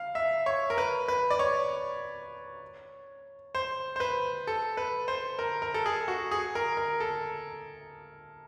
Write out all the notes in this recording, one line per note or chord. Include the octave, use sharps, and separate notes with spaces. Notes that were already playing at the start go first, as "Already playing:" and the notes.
Already playing: F5
E5
C#5
A#4
B4
B4
D5
C#5
C5
C5
B4
A4
B4
C5
A#4
A#4
A4
G#4
F#4
G#4
A#4
A#4
A4